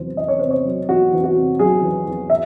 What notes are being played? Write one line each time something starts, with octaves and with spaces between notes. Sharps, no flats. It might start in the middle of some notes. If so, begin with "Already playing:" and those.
Already playing: E2 C3 F#3 C5
E2 D#5
C#5
C3 C5
C#5
F#3
E2 F#4
E2
F#4
C3
F#3 G#4
E2
E2
E5